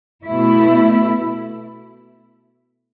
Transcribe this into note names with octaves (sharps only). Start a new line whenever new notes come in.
B2 A3 E4